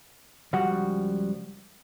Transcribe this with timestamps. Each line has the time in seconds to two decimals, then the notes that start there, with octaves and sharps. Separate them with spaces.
0.53 C#2 F3 G3 F#4 F#5